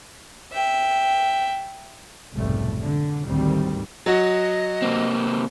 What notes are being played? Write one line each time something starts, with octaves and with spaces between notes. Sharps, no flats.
E5 G5
F1 B1 F2 G#2 G3 A3
D3
G#1 D2 A2 D#3 G3 C4
F#3 F#4 D#5
C3 A#3 C4